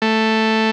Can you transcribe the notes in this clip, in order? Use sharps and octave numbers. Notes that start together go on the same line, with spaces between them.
A3